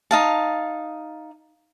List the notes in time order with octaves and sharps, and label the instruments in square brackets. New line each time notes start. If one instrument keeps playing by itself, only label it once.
[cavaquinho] D#4 F5 A5